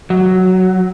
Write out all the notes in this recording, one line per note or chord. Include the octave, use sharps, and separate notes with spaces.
F#3